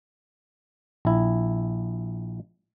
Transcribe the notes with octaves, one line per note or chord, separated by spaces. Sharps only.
A#1 E4